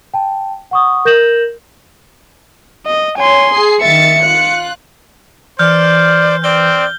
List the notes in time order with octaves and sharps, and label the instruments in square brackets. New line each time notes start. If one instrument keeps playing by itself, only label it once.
[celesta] G5 A5
F#5 C#6 D#6
A#4 G6 A#6 E7 F#7
[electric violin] D#5
[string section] C#5 [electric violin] G#5 C6
[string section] G#4 C7
[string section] D#3 E5 A6 [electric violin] C#7
[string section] F4 F#6
[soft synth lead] E3 [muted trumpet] C5 [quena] D5 [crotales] F6 G6
[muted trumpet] C4 [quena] D5 [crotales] G7